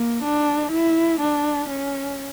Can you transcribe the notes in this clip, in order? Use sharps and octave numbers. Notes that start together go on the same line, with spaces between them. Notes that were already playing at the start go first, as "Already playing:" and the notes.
Already playing: A#3
D4
E4
D4
C#4